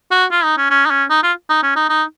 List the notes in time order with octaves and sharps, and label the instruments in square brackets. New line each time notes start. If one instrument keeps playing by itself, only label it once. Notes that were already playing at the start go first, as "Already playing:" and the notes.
[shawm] F#4
F4
D#4
C#4
C#4
D#4
C#4
D#4
F4
D#4
C#4
D#4
D#4